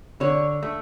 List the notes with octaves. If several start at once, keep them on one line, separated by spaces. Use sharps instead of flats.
D3 C#5
A3